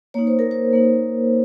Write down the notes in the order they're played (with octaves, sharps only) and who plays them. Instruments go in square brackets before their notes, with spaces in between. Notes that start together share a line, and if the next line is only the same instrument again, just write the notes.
[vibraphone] A#3 D#4 C#5
C5
A#4
C5
A#3 D#4